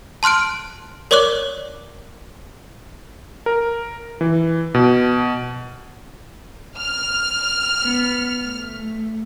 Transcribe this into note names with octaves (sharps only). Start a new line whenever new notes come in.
A5 C6 F6 F#6 D7
A#4 C#5 D5 C#6 D6 F#6
A#4
E3
B2
F6
B3
A3